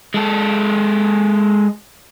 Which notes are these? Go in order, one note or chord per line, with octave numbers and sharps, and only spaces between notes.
G#3 A4